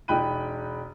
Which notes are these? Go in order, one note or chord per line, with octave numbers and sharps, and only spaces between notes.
E1 D#4 G5 B5 F#6 D#7